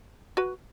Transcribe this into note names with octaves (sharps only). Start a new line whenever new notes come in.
F#4 B4